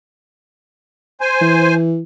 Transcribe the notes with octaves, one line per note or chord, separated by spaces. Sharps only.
C5 G#5
E3